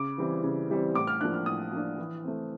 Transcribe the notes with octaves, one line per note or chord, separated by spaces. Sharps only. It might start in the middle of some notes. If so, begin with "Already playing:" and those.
Already playing: C#3 D6
E3 G3 C4
C#3
E3 G3 C4
A2 D6
F6
F3 A#3 D4 F#6
F6
A2 D#6
F3 A#3 D4
E3
A3 C4